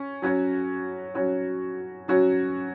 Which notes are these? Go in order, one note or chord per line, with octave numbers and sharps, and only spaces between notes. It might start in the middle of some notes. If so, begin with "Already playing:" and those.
Already playing: C#4
F#3 C#4 F#4 C#5
F#3 C#4 F#4 C#5
F#3 C#4 F#4 C#5